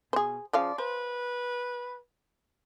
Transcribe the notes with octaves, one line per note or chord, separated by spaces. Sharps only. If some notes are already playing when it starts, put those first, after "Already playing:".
B2 G#4 C5
C#3 F3 D5 F5
B4 C5